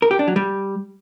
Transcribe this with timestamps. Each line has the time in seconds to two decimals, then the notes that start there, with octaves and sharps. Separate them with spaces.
0.02 A#4
0.11 G4
0.19 D4
0.28 F#3
0.36 G3